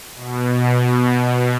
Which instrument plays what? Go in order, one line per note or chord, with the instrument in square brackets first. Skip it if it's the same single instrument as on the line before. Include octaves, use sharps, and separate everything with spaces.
[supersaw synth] B2